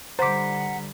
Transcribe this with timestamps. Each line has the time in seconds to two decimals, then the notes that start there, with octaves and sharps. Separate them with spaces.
0.19 D3 G3 C5 F#5 A#5 D6 B6